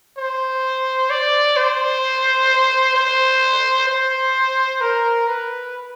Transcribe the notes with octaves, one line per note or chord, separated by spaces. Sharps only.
C5
D5
C5
C5
C5
A#4
B4